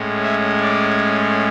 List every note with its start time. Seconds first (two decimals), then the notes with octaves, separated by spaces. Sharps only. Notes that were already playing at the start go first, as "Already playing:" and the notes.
Already playing: A2 G#3 C#4
0.24 E5
0.62 D5